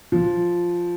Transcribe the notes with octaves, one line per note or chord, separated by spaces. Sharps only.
F3